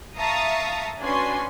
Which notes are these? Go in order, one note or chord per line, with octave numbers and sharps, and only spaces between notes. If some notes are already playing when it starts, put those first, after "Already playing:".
E5 F5 A5 A#5 C#6 D#6
C#4 D4 F#4 B4 G#5 C6